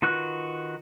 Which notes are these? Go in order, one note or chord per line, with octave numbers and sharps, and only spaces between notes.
D#3 F4 F#4 B4 F#6